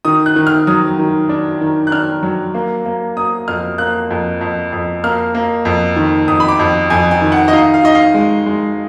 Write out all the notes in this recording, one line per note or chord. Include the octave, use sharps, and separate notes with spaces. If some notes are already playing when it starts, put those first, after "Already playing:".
D#3 D#6
F#6
D#3
F6
F#3 D#6
D#3
D4
D#3
F#6
D4 F6
F#3
A#3
A#3
A#3 D#6
F2 F6
A#3 F#6
F2
F2
F2
A#3 F6
A#3
F2
D#3
F2 D#6
B5
D6
F2
F2 G#5
G#5
D#3
F#5
D#5
D#4 F5
F5
D#4 D#5
F5
G#3
G#3